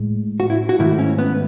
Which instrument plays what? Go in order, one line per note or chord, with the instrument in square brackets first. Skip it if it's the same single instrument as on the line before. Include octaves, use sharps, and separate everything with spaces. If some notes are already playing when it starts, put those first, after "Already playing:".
Already playing: [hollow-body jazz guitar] A2 G#3
F#4
E4
F#4
G#2 D#3 A3 E4
C#4
B3